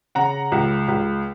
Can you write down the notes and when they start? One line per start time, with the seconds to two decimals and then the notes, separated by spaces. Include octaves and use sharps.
0.15 C#3 F#5 A#5
0.52 C#2
0.88 C#2